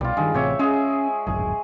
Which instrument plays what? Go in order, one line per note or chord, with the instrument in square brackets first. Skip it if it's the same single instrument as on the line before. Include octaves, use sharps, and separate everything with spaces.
[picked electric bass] C2 B2 [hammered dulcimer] G3 F4
[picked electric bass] G2 D#3 [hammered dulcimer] G#3
[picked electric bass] A1 C3 C4 [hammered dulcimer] G4 C#5 E5
[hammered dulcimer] G#3 G#4 [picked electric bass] C#4
[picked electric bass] D1 G#1 F#2 [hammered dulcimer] G#4